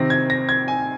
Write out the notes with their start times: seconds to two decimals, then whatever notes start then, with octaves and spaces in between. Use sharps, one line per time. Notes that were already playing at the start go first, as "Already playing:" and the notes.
Already playing: C3 D#3 C4 A#6
0.10 G#6
0.30 A#6
0.49 G#6
0.68 G#5